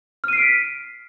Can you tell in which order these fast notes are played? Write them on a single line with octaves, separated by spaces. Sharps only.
F6 D#7 C7 D7 B6